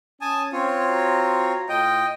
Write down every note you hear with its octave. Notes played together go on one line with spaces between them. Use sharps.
C#4 G#5 A5 D#6
C4 F4 C#5
F#4 A#5
A2 F4 D#5 G5